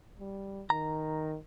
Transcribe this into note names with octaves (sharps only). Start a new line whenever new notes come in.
G3
D#3 A#5